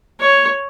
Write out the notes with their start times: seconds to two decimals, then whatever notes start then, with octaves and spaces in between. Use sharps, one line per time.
0.20 C#5